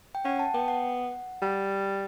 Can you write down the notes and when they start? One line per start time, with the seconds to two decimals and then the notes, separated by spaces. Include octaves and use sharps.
0.15 G5
0.24 C#4 F#5
0.39 A5
0.54 B3 G5
0.68 F#5
1.42 G3